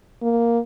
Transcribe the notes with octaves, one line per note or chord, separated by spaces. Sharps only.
A#3